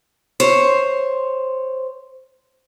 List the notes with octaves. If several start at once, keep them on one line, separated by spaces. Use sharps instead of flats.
C5 C#5